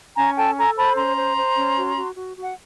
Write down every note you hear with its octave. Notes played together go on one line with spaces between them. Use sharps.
C#4 G#5 A#5
A4 G5 A5
A4 G#5 A#5
C5 A5 B5
C#4 A#5 C6
C5
C5
C#4
F#4
F#4
F#4
F#4
F#5